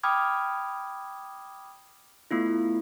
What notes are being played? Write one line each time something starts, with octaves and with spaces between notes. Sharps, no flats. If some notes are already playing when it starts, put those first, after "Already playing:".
G5 B5 D6 D#6 F6 G#6
A3 B3 E4 F4